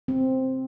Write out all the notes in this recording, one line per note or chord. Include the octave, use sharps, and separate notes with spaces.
C4